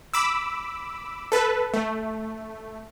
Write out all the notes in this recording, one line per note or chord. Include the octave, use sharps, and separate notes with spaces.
B5 D6 E6
A4 B4
A3